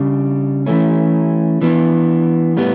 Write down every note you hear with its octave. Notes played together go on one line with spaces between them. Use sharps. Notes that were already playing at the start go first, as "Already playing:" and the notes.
Already playing: C#3 G3 D4
E3 A3 C#4
E3 B3 D4
A2 G3 B3